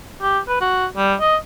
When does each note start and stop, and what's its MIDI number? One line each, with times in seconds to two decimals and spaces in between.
0.22 0.39 67
0.48 0.57 71
0.61 0.86 66
0.97 1.14 55
1.20 1.36 75